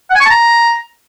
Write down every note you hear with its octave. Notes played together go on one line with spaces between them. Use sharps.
F#5
G#5
C#6
A5
A#5